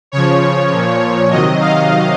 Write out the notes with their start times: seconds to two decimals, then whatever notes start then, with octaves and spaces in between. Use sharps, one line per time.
0.12 C#3 F3 C#5
0.71 A#2 F3
1.31 C3 D#3 F#3 D#5
1.60 F5